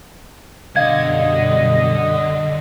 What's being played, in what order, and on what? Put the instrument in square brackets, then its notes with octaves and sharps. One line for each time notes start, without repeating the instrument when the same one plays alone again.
[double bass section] F#2 B2 G3 [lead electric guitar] D3 [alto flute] D#5 [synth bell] F5 G#6